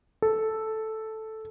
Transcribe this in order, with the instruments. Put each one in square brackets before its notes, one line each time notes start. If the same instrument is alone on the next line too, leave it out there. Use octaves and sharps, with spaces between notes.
[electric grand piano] A4